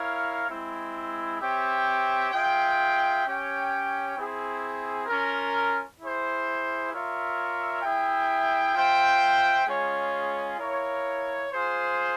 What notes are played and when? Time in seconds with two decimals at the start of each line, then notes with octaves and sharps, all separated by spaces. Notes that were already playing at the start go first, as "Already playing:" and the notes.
Already playing: E4 A#4 C#5 F5
0.49 G#3 C4 E4
1.40 C4 G4 C#5 E5 G5
2.32 F4 G#4 E5 G5
3.24 C#4 G4 C#5 G5
4.15 C4 E4 G#4
5.07 C#4 F4 A#4
5.99 E4 G#4 C5
6.91 F4 A#4 C#5 E5
7.82 E4 G#4 E5 G5
8.74 F4 C5 E5 G5
9.66 G#3 C#4 F4 G#4 C#5
10.58 E4 A#4 C#5 F5
11.50 F4 G#4 C5